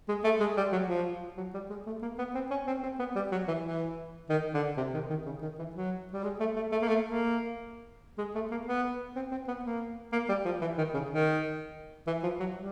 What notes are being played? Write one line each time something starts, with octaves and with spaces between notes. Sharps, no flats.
G#3
A3
G#3
G3
F#3
F3
F#3
G3
G#3
A3
A#3
B3
C4
C#4
C4
C4
B3
G3
F#3
E3
E3
D#3
D3
C3
D#3
D#3
C#3
D#3
E3
F#3
G3
G#3
A3
A3
A3
A#3
A3
A#3
G#3
A3
A#3
B3
C4
C4
B3
A#3
A#3
G3
F3
E3
D#3
C#3
D#3
E3
F3
F#3
G3